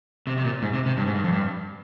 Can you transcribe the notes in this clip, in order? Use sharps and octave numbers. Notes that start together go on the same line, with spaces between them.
C3
C3
A#2
G#2
C3
C3
G2
G#2
G2
F2
G2